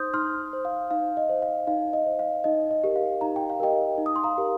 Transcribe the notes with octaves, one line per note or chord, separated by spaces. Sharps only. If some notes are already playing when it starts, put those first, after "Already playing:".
Already playing: D#4 C5 C6 D#6 G6
D#4 C6 F6
C5
F5
D#4 F5
D#5
C5
F5
D#4 F5
D#5
C5
F5
D#4 D#5
D#5
G4 A#4
F5
D#4 A#5
G5
F5
G4 A#4 D#5 G5
D#4
D#6
C6
F5 A#5
G4 A#4